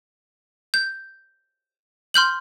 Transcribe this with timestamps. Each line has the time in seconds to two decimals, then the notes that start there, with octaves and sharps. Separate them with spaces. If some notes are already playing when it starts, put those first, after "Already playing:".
0.74 G6
2.14 C6 F6 G6 F#7